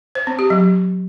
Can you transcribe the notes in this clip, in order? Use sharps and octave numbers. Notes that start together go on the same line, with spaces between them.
C5
C4
G4
F#3